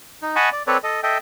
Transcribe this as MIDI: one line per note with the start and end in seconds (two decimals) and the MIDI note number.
0.22 0.36 63
0.36 0.49 75
0.36 0.49 78
0.36 0.49 80
0.36 0.49 81
0.36 0.49 83
0.36 0.49 85
0.52 0.63 74
0.67 0.78 60
0.67 0.78 69
0.67 0.78 71
0.67 0.78 73
0.67 0.78 74
0.83 1.01 69
0.83 1.01 75
1.03 1.18 69
1.03 1.18 75
1.03 1.18 76
1.03 1.18 79